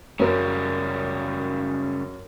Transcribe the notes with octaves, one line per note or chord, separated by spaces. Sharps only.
F#2 C#3 G3 A#4